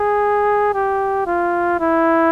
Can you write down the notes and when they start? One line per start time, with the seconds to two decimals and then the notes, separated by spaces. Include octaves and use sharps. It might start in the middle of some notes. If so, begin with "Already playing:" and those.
Already playing: G#4
0.74 G4
1.26 F4
1.80 E4